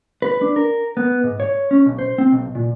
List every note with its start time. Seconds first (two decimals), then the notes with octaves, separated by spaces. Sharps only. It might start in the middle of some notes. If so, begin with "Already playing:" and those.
0.22 B4
0.42 D4
0.56 A#4
0.97 B3
1.24 G#2
1.40 C#5
1.71 C#4
1.86 B1
1.99 C5
2.18 C4
2.32 B1
2.55 A#2